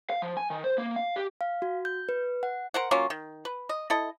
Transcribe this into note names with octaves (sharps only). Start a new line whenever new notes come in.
F5
F3
G#5
D#3
C5
A#3
F5
G4
F5
F#4
G6
B4
F#5
A#4 C5 F#5
F#3 A#3 C#4 F4
D#3
B4
D#5
E4 A4 D#5